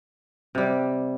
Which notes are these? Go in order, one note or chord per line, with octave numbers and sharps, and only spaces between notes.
C3 G3